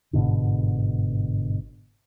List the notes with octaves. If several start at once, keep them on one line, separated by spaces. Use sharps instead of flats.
G1 G#2 B2 D3